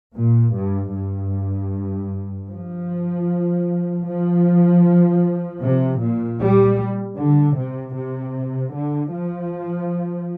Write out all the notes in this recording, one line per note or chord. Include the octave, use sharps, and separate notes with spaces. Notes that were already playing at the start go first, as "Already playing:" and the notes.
A#2
G2
G2
F3
F3
C3
A#2
G3
D3
C3
C3
D3
F3